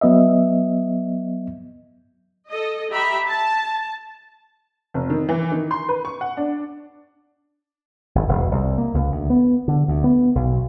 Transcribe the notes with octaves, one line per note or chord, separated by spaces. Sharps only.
F#3 B3 D#5 E5
A4 D#5
G4 E5 A#5 B5
A5
F1
D#3
E3
D#3
C6
B4
C#6
F#5
D4
G#1
E1
C2
A#3
C#2
D2
B3
D3
D2
B3
B1